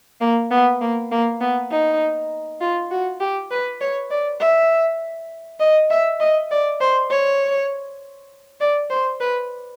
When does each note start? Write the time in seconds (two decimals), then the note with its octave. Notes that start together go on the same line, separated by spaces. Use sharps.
0.21 A#3
0.51 B3
0.81 A#3
1.11 A#3
1.41 B3
1.71 D#4
2.61 F4
2.91 F#4
3.20 G4
3.51 B4
3.81 C#5
4.11 D5
4.41 E5
5.60 D#5
5.90 E5
6.20 D#5
6.51 D5
6.81 C5
7.10 C#5
8.60 D5
8.90 C5
9.20 B4